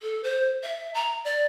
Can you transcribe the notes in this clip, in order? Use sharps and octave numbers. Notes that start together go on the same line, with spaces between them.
A4
C5
E5
A#5
D5